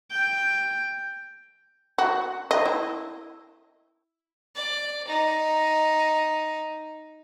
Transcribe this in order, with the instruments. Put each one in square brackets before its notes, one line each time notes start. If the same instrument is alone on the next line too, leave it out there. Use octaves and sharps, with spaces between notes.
[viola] G5
[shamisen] F#4
D#5
E4
[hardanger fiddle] D5
D#4